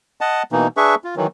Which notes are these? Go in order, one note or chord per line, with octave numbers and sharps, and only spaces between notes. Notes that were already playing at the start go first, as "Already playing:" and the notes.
D#5 F#5 A5
B2 E3 A#3 D#4
D4 G#4 B4 E5 C#6
F4
D#3 E3 F#3